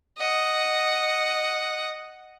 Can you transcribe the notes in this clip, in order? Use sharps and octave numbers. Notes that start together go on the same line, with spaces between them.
D#5 F#5